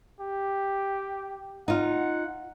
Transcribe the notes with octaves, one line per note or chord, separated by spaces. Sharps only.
G4
D#4 F4 F#5